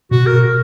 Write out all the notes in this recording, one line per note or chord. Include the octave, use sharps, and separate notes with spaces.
B2 F#4
A#4